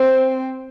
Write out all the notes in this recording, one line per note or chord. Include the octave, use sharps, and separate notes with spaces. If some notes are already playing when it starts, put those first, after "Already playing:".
Already playing: C4 C5